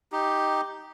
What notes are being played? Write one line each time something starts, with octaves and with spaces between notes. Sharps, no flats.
D#4 G4